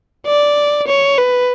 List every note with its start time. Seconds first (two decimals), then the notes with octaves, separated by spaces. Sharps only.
0.27 D5
0.88 C#5
1.18 B4